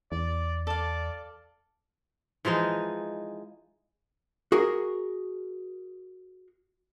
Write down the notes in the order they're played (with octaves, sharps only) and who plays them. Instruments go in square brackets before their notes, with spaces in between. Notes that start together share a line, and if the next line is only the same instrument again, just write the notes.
[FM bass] E2 [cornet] D5
[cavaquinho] A4 F5 [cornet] D5
[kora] E3 F3 G#3 D#4
[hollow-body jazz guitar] F#4 G#4 A#4